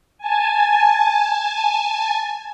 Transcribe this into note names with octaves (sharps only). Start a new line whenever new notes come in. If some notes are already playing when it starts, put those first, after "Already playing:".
G#5 A5